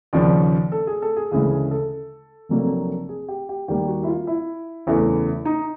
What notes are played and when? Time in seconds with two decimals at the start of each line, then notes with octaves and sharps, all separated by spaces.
0.13 D#2 C#3 F3 D5
0.72 A4
0.87 G#4
1.02 A4
1.17 G#4
1.31 D2 C#3 E3 G#3 G#4
1.51 G#4
1.71 A4
2.49 F1 F2 D3 F#3 A#3
3.09 G#4
3.28 G4
3.49 G4
3.68 D#2 D#3 G3 A#3 G4
3.88 F#4
4.03 E4
4.08 F4
4.27 E4
4.87 F#1 E2 C#3 E3 A3
5.45 D#4